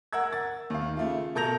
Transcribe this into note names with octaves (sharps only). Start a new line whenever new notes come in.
A#4 F#5 E6 G#6
A6
D#2 F5
C#3 A3 F4
B2 A4 A#4 G6 A#6 F7